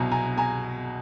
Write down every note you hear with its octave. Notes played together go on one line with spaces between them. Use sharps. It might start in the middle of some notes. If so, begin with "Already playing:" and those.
Already playing: C2 B2 F#3 G#5 A#5
G#5 A#5
G#5 A#5